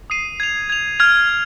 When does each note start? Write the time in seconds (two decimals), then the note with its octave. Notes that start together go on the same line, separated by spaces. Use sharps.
0.10 D#6 C7 D#7
0.40 G#6 F7
0.70 G#6 F7
1.00 F6 G#6 F7
1.29 F6